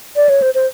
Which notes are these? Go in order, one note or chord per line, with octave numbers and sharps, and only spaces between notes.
D5
C#5
C5
C5